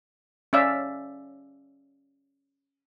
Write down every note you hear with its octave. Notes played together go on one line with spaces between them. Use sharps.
C#4 D5 E5 F5